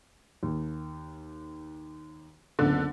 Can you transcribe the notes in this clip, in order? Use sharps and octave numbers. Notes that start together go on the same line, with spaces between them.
D#2
F#1 C#2 D3 B3